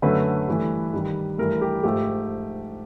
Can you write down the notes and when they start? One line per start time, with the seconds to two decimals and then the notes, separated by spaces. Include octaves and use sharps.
0.02 F#2 D3 F#3 A3 B4
0.47 G2 E3 A3
0.93 G2 D#3 G3
1.38 G2 E3 A3 A#4
1.61 G4
1.83 G#2 F3 A3 G4